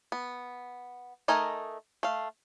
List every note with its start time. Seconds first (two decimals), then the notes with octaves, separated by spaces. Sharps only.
0.12 B3
1.28 A3 D#4 A#4 D#5 G#5
2.03 A3 F5